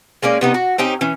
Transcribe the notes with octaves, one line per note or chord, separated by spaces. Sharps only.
G#3 A#3 C#4 D5
C3 B3 D#4
F#4
C4 C#4 D#4 G4
E3 C#4